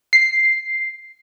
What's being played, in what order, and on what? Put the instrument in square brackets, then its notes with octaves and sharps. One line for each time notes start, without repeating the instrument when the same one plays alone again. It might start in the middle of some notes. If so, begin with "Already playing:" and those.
[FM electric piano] C7